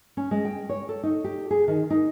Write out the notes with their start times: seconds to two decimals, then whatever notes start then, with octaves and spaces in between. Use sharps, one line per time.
0.17 C#4
0.31 G#3
0.45 G5
0.69 C#5
0.89 A4
1.03 D#4
1.24 G4
1.51 G#4
1.68 D#3
1.90 D#4